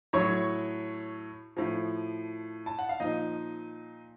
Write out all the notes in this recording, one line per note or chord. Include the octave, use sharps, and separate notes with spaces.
A2 F#3 C#5 C#6
A2 F3
A5
F#5
F5
A#2 F3 D#4 D#5